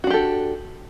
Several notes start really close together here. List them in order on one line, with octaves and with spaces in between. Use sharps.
F#4 D4 G4 A4